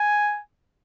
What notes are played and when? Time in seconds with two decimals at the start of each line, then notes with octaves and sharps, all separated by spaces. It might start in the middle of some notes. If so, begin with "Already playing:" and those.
Already playing: G#5